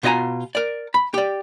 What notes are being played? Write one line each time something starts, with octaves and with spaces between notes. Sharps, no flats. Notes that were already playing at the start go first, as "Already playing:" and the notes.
B2 F4 D#5 G#5 A#5
A#4 D5
B5
G4 D5